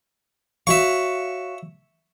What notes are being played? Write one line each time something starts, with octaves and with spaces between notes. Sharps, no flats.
F#4 C#5 E5 F5 C#6